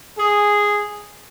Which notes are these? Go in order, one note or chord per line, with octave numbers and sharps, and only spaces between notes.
G#4